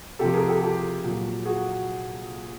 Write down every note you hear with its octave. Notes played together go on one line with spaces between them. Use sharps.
C3 F3 G4 A4
G#4 A#4
G4 A4
G4 A4
A#2 F#3
F#4 G#4